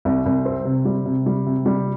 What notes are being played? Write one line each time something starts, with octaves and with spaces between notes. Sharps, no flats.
C2
C2
C4
C3
G3
C3
G3
C3
G3